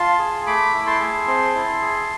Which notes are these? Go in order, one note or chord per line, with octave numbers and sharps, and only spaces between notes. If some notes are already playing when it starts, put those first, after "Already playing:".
Already playing: F4 A5 C6
G#4
A3 B5 D6
E4
A5 C6
G#4
C4
E4
G#4